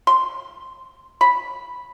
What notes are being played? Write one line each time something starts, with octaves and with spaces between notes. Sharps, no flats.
C6
B5